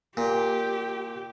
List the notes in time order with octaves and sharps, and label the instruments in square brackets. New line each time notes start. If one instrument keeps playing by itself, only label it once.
[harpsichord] A#2 [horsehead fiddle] G4